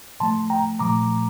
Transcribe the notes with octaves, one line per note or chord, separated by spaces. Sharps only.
A2 F3 A3 A5 C6
G5 A#5
A#2 F3 A3 A#5 D6